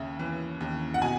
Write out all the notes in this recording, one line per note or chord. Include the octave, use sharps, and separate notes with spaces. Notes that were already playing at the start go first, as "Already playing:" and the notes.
Already playing: D#2 C#3 E5
E3
D#2
F#5
B2 G#5